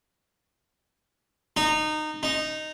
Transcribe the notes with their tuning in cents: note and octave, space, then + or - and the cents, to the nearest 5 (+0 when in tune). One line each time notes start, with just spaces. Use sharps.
D#4 -20
D#4 -10